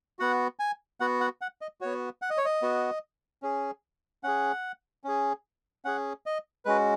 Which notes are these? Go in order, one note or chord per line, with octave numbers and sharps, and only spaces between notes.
B3 F#4 F#5
G#5
B3 F#4 F#5
F#5
F#5
D#5
B3 F#4 C#5
F#5
D#5
C#5
D#5
B3 F#4
C#4 G#4
C#4 G#4 F#5
C#4 G#4
C#4 G#4 F#5
D#5
G#3 C#4 F#4 B4